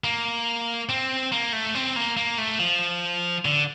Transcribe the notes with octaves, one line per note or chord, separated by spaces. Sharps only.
A#3
C4
A#3
A3
C4
A#3
A#3
A3
F3
D3